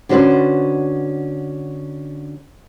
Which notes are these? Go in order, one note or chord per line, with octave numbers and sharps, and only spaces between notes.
D3 C#4 F#4 B4 C5